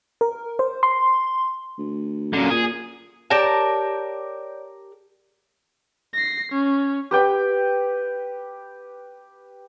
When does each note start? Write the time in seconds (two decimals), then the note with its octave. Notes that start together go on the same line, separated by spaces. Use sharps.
0.21 A#4
0.59 C5
0.83 C6
1.78 D2
2.34 F#2 A#2 D3
2.51 A#2 G#4
3.30 G4 A#4 C#5 D5 A5 G6
6.13 A#6 C7
6.52 C#4
7.11 G4 B4 G5